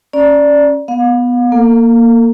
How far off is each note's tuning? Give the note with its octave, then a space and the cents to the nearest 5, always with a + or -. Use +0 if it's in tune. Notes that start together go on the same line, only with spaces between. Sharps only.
C#4 +0 D5 +0 A#5 +20
B3 +0 F5 +40
A#3 +0 A4 +45